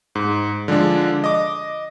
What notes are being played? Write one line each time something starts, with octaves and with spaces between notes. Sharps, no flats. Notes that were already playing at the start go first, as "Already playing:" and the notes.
G#2
D3 F3 G#3 D4
D#5 D6